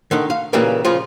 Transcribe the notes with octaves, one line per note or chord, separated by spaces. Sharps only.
D3 D#3 D#4
F5
A#2 C#3 E3 G3 A#3
C#3 F3 F4